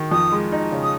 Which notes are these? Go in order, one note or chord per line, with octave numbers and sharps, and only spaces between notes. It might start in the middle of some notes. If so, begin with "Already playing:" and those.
Already playing: D#3
F2 D#6
G#3
D#4
C#3
D#6